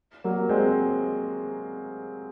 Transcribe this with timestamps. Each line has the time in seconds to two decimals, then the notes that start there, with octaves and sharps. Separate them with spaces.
0.24 F#3 A#3
0.49 G#3 C4